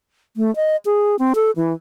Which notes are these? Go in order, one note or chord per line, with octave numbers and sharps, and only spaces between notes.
A3
D#5
G#4
C4
A4
E3